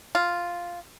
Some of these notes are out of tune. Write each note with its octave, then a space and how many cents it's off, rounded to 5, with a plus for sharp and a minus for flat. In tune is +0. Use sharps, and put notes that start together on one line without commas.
F4 +0